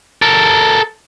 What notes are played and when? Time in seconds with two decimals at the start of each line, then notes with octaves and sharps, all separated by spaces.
0.22 A4 A#4